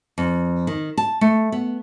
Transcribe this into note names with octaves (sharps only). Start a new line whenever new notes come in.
F2
D#3
A5
A3
B3